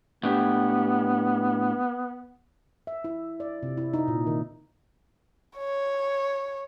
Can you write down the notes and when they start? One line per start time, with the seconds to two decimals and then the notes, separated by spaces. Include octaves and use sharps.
0.23 A2 B3 D4 G4
2.87 E5
3.04 E4
3.40 D5
3.63 C3
3.77 E4
3.94 D#4
4.08 A#2
4.27 D#3
5.57 C#5